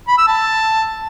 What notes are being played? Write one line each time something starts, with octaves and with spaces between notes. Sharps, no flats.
B5
E6
A5